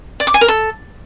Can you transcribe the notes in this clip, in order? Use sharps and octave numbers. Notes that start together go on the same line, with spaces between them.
D5
D6
G#5
A#4
A4